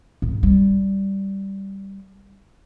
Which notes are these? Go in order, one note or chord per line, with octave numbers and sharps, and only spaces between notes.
G#2
G3